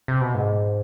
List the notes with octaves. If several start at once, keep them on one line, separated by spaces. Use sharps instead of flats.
C3
B2
G#2